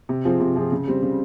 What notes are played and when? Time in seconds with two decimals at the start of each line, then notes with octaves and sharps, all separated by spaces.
0.09 C3
0.25 F3 C4 F4 G#4
0.40 C3
0.56 F3 C4 F4 G#4
0.72 C#3
0.87 G3 C4
1.03 C#3